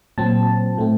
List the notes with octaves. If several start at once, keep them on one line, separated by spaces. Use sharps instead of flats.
A#2 F#3 C4 A5
A2 A3 C4